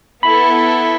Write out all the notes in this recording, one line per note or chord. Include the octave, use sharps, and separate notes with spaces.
B3 E4 A4 B5